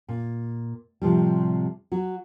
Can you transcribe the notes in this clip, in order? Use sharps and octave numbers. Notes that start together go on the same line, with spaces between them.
A#2
A2 C3 F3 G3
F#3 F#4